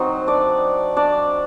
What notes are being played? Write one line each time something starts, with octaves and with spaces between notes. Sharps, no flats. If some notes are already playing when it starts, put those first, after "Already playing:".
Already playing: F#3 C4 D#4 C5
D4 D5
D4 D5